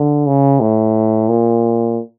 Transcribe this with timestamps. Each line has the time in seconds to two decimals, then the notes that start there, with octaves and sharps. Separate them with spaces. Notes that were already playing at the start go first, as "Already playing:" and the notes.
Already playing: D3
0.26 C#3
0.60 A2
1.29 A#2